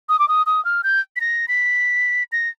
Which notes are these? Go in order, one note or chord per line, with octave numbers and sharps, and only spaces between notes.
D#6
D6
D#6
D#6
F6
G6
B6
A#6
B6
A#6